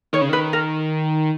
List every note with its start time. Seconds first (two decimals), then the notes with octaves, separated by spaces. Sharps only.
0.13 D#3 C#5
0.22 C#3
0.29 D#3 B4
0.53 A#4